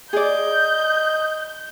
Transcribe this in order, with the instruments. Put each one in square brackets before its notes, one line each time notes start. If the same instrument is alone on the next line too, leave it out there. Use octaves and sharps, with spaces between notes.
[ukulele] G#4 D5 [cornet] D#5 [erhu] G6